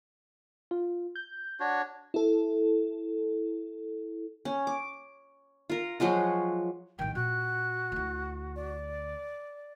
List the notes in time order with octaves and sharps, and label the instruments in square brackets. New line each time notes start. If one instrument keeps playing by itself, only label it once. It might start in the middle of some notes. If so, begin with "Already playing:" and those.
[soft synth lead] F4
G6
[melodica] D4 F#4 C#5
[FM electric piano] E4 A4
[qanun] C#4
D6
F4 A#4
F3 F#3 G#3 F4
[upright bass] A1 D#3 [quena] G5
[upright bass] A#2 [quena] F#4 [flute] F#6
[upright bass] D2 E4
[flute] D5